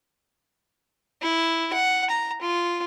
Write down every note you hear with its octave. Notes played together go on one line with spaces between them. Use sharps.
E4
F#5
A#5
F4